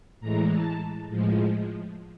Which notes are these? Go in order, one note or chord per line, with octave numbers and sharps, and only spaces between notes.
A2 E3 G#3 A#5
A5
A2 F3 G#3